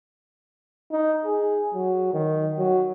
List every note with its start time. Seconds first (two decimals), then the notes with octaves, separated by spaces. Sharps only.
0.91 D#4
1.25 G#4
1.74 F#3
2.14 D#3
2.58 F#3